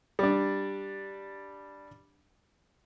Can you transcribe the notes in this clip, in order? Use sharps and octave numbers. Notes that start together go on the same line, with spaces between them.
G3 D4